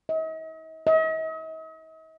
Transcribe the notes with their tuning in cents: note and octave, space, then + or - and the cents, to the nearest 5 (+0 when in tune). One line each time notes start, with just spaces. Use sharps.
D#5 +45
D#5 +45